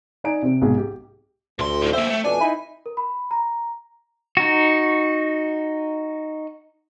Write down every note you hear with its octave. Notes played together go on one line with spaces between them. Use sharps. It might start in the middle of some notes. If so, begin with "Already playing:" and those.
D#4 D5 G#5 A#5 D7
C3 C4
B1 G#2 G#4
G4
D2 A#2 C6
A2 D#3
A#3 C4 C5 E5
A3
F2 B2 D4 G#5
D#4 E4 B5
A#4
B5
A#5
D#4 F#4